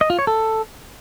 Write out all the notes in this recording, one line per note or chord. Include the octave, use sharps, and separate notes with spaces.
D#5
F4
C#5
A4